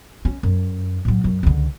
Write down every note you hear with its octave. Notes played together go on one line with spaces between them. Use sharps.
C#4
F#2
A2 F#3
F#2
C#2 D3